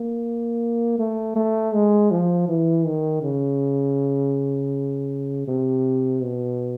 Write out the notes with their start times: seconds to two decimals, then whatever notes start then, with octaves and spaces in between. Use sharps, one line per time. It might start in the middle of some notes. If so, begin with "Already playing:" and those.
Already playing: A#3
0.99 A3
1.36 A3
1.74 G#3
2.11 F3
2.48 E3
2.86 D#3
3.23 C#3
5.47 C3
6.22 B2